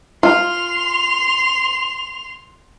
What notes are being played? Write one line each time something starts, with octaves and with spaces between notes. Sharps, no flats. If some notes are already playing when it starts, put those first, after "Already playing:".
F4 C6 F7